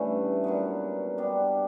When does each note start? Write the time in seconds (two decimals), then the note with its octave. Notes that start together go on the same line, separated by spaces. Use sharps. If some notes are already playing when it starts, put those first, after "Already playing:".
Already playing: G2 E3 A3 C#4
0.44 A#2 F#3 B3
1.18 G3 B3 D4